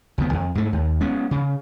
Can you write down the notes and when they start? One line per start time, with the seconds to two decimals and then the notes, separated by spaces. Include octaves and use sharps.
0.18 C#2 D#3 B3
0.33 F2
0.55 G#2 A3
0.73 D#2
1.01 G#3 B3 C#4
1.31 C#3